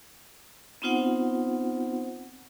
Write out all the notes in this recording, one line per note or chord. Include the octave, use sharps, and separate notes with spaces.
B3 C4 D#4 F4 C5 F#5